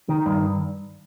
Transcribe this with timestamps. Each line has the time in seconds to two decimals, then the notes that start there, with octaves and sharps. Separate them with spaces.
0.09 D#3
0.26 G2